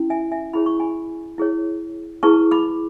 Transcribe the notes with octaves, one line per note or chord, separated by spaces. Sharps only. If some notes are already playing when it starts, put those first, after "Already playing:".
Already playing: C#4 E4
E5 G#5
E5 G#5
E4 G#4 C#5 B5
C#6
G#5 B5
E4 G#4 C#5
E4 G#4 B4 A5 C#6
B5 D6